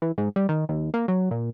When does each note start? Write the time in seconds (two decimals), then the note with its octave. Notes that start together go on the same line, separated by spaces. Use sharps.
0.02 E3
0.18 G#2
0.36 G3
0.49 D#3
0.69 D#2
0.94 A#3
1.08 F#3
1.31 A#2